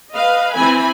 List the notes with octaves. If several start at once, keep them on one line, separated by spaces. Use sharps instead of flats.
B4 D#5 F5
E3 C4 G#5 B5